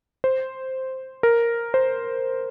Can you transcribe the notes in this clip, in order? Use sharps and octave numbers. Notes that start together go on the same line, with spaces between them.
C5
A#4
C5